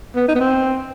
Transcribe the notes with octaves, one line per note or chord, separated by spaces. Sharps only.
B3
D#4
B3
C4